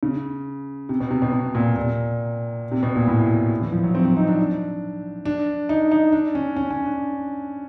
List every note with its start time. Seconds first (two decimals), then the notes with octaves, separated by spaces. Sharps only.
0.03 C#3
0.89 C3
1.00 B2
1.11 C3
1.22 B2
1.33 B2
1.55 A#2
1.76 A#2
2.72 C3
2.83 B2
2.96 A#2
3.07 A2
3.62 E3
3.72 F3
3.84 F#3
3.95 C4
4.05 C4
4.17 D#4
4.27 D4
5.25 D4
5.69 D#4
5.92 D#4
6.12 D4
6.35 C#4
6.56 C#4
6.70 C#4
6.86 D4